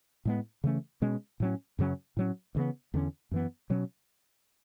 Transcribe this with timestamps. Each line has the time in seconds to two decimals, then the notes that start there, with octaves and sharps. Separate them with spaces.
0.25 A2 G#3 B3
0.64 C#3 E3 A3 C#4
1.02 B2 G#3 C#4
1.40 A2 F#3 C#4
1.79 F#2 C#3 F#3 C#4
2.17 A2 F#3 C#4
2.55 D2 C#3 E3 B3
2.94 E2 D3 A3 C#4
3.31 F#2 E3 B3
3.70 B2 F#3 C#4